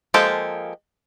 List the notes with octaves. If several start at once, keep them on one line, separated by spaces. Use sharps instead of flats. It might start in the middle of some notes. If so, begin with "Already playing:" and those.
F3 G#3 A#3 G4 A4